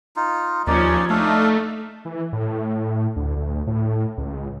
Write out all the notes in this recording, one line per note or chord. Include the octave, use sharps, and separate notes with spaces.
D#4 F4
D#2 F3 C#4 D#4 D5
A3 D4 D#4 A4 F5
E3
A2
D2
D2
A2
C#2